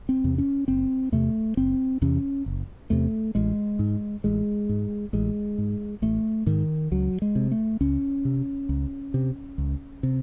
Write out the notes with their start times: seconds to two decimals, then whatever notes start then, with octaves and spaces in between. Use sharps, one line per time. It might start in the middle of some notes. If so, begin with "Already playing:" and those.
0.09 C4
0.24 E2 C3
0.38 C#4
0.68 F#1 C4
1.12 E2 C3 A3
1.57 F#1 C4
2.02 E2 C3 C#4
2.46 F#1
2.90 E2 C3 A3
3.35 A1 G#3
3.79 G#2
4.24 A1 G#3
4.69 G#2
5.13 A1 G#3
5.58 G#2
6.02 A1 A3
6.46 G#2 D#3
6.92 C#2 F#3
7.22 G#3
7.35 C3
7.51 A3
7.81 C#2 C#4
8.25 C3
8.69 C#2
9.14 C3
9.58 C#2
10.03 C3